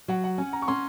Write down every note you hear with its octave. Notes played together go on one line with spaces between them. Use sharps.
F#3 F#5
F#5
C#4 G#5
A#5
C#6
C#4 C6